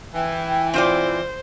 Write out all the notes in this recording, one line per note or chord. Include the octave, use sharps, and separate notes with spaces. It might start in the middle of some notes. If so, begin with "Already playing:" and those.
E3 G5
C4 F4 C5 D5